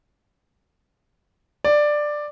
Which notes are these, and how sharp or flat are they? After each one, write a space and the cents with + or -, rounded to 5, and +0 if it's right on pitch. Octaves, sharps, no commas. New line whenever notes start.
D5 +10